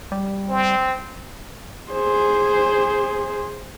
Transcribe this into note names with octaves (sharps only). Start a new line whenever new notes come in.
G3
C4
G#4 C5